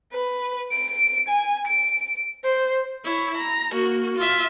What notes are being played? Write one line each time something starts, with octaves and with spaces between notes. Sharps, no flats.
B4
D7
G#5
D7
C5
E4 C#5
A#5
A#3 F#4
F4 E5